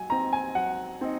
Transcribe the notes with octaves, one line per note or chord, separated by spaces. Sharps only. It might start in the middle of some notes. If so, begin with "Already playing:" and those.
Already playing: F#3 G#5
C4 D#4 A#5
G#5
F#3 F#5
C4 D#4